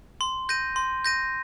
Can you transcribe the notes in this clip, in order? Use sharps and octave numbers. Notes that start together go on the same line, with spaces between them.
C6
G6 A#6 D#7
C6
G6 A#6 D#7